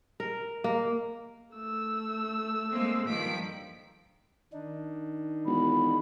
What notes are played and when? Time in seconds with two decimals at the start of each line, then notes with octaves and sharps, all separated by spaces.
0.20 A#4
0.64 A#3
1.54 A3 E6
2.72 G#3 A#3 C4
3.08 G2 D#3 F3 B6 D7
4.53 D#3 D4 D#4
5.46 E1 B5